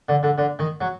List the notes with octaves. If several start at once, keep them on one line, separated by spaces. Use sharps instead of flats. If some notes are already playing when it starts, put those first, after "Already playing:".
D3
D3
D3
D#3
F#3